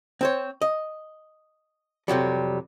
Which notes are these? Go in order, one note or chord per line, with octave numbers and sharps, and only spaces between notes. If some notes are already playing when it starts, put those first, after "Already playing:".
C4 C5 C#5
D#5
F2 C3 F#3 G3